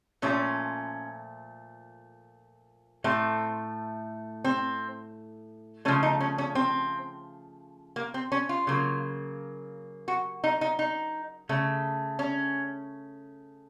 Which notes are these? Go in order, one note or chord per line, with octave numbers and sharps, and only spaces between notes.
A#2 F3 A3 C#4
A2 A3 C4
C4
C#3 F3 A3 C#4
D#4
C#4
C#4
C4
A#3
C4
C#4
F4
C#3 F#3 A#3
F#4
D#4
D#4
D#4
C#3 A3
C#4